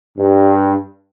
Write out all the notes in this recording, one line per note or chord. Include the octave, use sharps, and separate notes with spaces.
G2